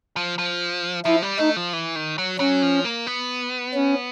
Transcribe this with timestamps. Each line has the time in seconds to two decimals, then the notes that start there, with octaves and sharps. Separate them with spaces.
0.16 F3
0.38 F3
1.05 F3 E4
1.22 G3
1.39 A3 D#4
1.57 F3
1.73 E3
1.96 D#3
2.18 F#3
2.39 F#3 C#4
2.62 F3
2.85 A#3
3.07 B3
3.74 C#4